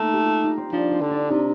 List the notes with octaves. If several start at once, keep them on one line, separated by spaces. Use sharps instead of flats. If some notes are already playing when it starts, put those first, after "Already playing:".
Already playing: A3 A#3 D#4 F4
G4
F4
D#4
C4
F3 D4
C4
D3
D4
C3 D#4